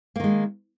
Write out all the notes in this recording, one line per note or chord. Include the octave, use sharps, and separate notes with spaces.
D#3 G#3 A#3